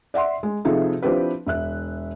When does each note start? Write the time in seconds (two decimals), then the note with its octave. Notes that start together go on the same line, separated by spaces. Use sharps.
0.14 D5 E5 F#5 C6
0.43 G#3
0.65 C3 F3 D#4 G#4 A4 E5
1.02 F3 C4 D4 E4 G4 B4
1.46 E1 E5 F#6